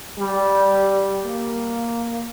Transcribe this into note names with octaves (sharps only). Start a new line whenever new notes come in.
G3
A#3